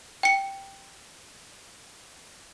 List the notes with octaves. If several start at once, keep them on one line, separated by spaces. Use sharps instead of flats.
G5 C#7